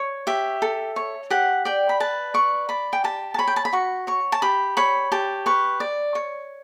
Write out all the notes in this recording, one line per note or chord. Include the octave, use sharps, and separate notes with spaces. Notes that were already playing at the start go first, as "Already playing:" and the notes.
Already playing: C#5
G4 E5
A4
C#5
G4 F#5
D5 G5
B5
B4 A5
D5 C#6
D5 B5
G5
G4 A5
A5
C#5 B5
G5
A5
B5
F#4 C#6
C#5 C#6
A5
G4 B5
C#5 B5
G4 A5
B4 C#6
D5
C#5